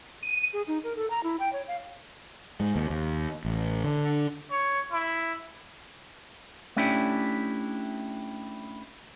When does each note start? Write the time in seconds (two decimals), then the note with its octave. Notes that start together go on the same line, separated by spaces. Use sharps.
0.23 D#7
0.53 G#4
0.68 D#4
0.84 A#4
0.96 A4
1.10 A#5
1.23 E4
1.40 G5
1.53 C#5
1.68 F5
2.60 G#2
2.76 D#2
2.90 D#2
3.45 A1
3.84 D3
4.51 C#5
4.92 E4
6.77 A3 C#4 D4 E4 G4